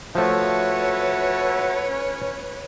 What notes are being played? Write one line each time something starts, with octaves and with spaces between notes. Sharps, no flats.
F3 A3 F#4 B4 C#5 E5 A5
C#4